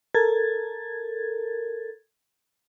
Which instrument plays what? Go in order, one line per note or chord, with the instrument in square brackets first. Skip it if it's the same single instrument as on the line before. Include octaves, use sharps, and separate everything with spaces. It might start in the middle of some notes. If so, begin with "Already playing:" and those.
[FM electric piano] A4 A#4 G#6 A6